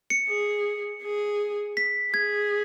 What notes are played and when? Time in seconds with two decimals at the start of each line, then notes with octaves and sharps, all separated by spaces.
0.10 C#7
0.28 G#4
1.03 G#4
1.77 B6
2.13 G#4 G#6